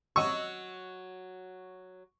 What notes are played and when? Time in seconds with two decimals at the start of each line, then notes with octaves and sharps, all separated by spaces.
0.16 F#3 F#4 D#5 C#6 E6